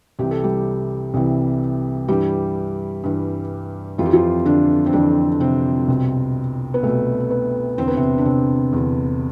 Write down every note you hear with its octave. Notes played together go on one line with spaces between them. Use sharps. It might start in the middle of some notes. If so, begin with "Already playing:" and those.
C2 C3 E3 G4
A4
G3 G4
C2 C3 E3
G2 E3 G3 G4
G2 E3
F2 E3 F4
G4
F3 F4
D3 D4
C4
F2 D3 E3 D4
C3 C4
C2 B2
B3
C2 B2 A3
B3
E2 D3 C4
B3
C3 C4
D4
C3 C4
E2 D3